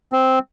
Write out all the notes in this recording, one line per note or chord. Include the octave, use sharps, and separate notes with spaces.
C4